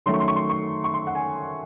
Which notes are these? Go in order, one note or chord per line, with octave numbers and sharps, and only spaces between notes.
D#3 F#3 A3 C#4 C6
C#6
C6
C#6
C6
C#6
C#6
C6
F#5
G#5